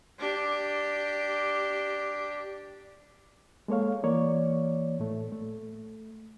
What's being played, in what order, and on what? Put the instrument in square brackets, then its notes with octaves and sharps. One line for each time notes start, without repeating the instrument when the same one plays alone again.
[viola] D4 G4
[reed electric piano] G#3 A#3 A4 C#5 F5
E3 A#3 C#5 D5
A2 A3
A3